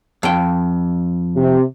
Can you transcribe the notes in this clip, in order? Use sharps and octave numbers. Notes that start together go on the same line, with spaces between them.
F2 G5
C3